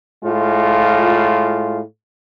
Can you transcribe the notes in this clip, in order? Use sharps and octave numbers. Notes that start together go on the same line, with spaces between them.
A2 G#3 F4